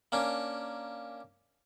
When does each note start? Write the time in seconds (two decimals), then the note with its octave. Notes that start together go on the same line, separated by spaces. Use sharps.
0.12 A#3 C#4 D4